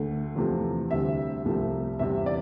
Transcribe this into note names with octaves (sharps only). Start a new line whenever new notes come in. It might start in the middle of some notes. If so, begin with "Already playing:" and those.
Already playing: D2 D3 A3
E2 C3 F3 A3
D2 C3 G3 E5
C2 C3 F3 A3
E2 C3 G3 E5
D5